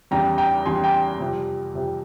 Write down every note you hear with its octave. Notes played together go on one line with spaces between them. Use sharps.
E2 C#3 G3 G5 A#5
G5 A#5
E2 C#3 G3 G#5 C6
G5 A#5
F2 C3 G3
F2 C3 G3